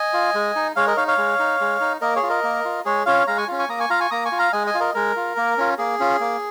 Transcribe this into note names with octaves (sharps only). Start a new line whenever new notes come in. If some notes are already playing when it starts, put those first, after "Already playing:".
Already playing: D#5 G#5
F4
G#3
D#4
G#3 C#5 F5
A#4 D#5
D#4 C#5 F5
C#5 F5
G#3
D#4
G#3
D#4
A#3 A#4 D#5
G#4 C#5
F4
A#4 D#5
A#3
F4
G#3 G#4 C#5
C#4 F4 C#5 F5
G#3 F5 A#5
G#5 C#6
C#4 F4
G#5 C#6
A#3 A#5 D#6
G#5 C#6
F4 F5 A#5
G#5 C#6
A#3 A#5 D#6
G#5 C#6
F4
F5 A#5
G#3 D#5 G#5
D#5 G#5
F4
A#4 D#5
G#3 A#4
F4
A#3
C#4 F4
A#3 G#4
C#4 F4
A#3